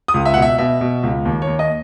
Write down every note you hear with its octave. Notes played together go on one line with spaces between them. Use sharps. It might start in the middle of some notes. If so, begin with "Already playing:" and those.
D#6
C#2
E5
B2 F#5
E5
B2 E5
B2
C#2
D#2
C#5
D#2
D#5